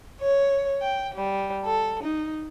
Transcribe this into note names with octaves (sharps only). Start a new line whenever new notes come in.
C#5
G5
G3
A4
D#4